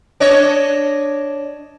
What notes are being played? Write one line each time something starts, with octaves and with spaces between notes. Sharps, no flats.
D4 C#5 D#5